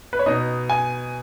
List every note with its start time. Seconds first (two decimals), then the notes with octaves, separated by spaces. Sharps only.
0.13 B4
0.19 C#5
0.26 B2 B3 D#4 D#5
0.70 G#5